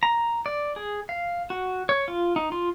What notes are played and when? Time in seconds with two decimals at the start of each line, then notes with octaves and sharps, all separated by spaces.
0.03 A#5
0.46 D5
0.76 G#4
1.09 F5
1.50 F#4
1.89 C#5
2.08 F4
2.36 D#4
2.52 F4